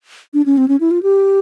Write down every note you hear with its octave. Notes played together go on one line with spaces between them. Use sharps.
D4
C#4
C4
C#4
E4
F4
G4